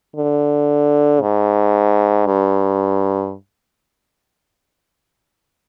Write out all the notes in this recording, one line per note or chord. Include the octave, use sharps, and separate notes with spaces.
D3
G#2
G2